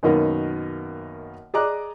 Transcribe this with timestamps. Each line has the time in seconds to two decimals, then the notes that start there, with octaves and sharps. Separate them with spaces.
0.03 F#2 B2 D#3 A#3
1.54 G#4 D5 D#5 A#5 D6 F#6